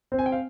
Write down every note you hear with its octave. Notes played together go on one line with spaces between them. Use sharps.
C4
G#5
G5
F5